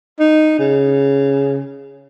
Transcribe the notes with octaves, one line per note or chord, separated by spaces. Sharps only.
D#4
C#3